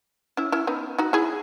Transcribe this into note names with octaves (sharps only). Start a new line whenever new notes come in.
C#4 E4
C#4 E4
B3 D#4
D#4 F#4
E4 G#4